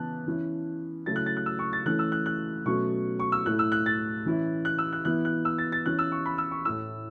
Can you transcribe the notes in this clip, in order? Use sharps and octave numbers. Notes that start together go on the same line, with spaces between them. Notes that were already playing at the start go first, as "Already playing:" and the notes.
Already playing: C#3 E3 B3 A5 F#6
E3 C#4 E4
C#3 F#3 A3 E4 A6
F#6
A6
F#6
E6
C#6
A6
E3 A3 C#4 E4 F#6
E6
F#6
F#6
B2 F#3 A3 C#4 C#6
C#6
E6
A2 A3 E4 F#6
E6
F#6
A6
E3 C#4 E4
F#6
E6
F#6
E3 B3 E4 F#6
F#6
E6
A6
A6
E3 C#4 E4 F#6
E6
C#6
B5
E6
C#6
A2 A3 E4 E6